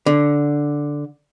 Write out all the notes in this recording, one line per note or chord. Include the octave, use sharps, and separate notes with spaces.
D3